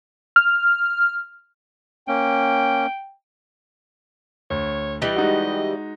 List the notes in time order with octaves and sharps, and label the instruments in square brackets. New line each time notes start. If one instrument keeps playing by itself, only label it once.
[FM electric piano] F6
[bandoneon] A#3 C#4 [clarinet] G5
[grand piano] D2 [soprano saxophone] C#5
[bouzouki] E3 G3 [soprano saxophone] D#5
[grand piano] G#3 D#4 F#4